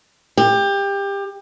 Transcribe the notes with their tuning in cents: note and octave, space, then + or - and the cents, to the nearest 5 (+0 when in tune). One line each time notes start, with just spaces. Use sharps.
G4 +25